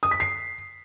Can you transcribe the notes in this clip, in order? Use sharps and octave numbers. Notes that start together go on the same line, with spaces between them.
D#6
B6
C7